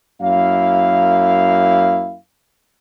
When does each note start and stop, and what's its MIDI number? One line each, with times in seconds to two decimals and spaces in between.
0.21 2.15 42
0.21 2.15 58
0.21 2.15 64
0.21 2.15 77